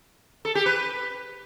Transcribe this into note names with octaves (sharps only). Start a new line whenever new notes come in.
A4
G4
B4